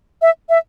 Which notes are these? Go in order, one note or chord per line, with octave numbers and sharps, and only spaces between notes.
E5
E5